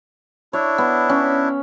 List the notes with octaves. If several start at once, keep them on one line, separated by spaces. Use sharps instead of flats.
D4 E4 C#5
B3
C#4